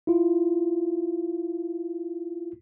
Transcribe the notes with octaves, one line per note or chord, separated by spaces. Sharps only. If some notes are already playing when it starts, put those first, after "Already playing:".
E4 F4